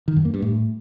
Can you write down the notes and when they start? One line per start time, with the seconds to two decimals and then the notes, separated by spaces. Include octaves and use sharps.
0.08 D#3
0.16 F#2
0.25 A#3
0.34 G2
0.42 A2